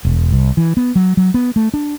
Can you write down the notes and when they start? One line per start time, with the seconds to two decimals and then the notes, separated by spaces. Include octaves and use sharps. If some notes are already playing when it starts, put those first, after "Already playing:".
0.05 E1
0.32 C2
0.57 E3
0.77 B3
0.96 F#3
1.17 F#3
1.34 B3
1.56 A3
1.74 D4